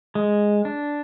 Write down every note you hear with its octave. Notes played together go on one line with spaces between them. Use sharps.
G#3
D4